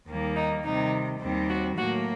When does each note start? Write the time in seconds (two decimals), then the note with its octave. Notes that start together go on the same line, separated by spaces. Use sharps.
0.08 D#2 D#3 G3 A#3
0.37 D#4
0.65 C3 D#3 G3 D#4
1.21 D#2 D#3 G3 C4
1.50 F#4
1.78 A2 F#3 A#3 F#4